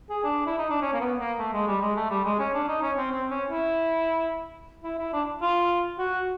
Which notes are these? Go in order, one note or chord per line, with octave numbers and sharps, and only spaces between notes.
G#4
D4
E4
D#4
D4
C#4
A#3
B3
A#3
A3
G#3
G3
G#3
A3
G3
G#3
C#4
D4
D#4
C#4
C4
C4
C#4
E4
E4
E4
D4
F4
F#4